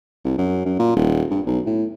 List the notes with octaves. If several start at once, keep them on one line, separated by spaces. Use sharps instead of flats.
C2
F#2
F#2
A#2
D#1
G2
B1
A2